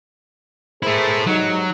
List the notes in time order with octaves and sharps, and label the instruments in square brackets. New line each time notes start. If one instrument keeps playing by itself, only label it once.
[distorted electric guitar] A3 E4 [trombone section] G#4 A#4 C5
[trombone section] G#2 G3 D#4 [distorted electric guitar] F#3